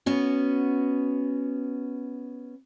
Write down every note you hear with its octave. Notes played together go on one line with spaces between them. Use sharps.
B3 C#4 F#4